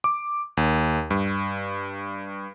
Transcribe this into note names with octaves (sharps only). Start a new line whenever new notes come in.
D6
D#2
G2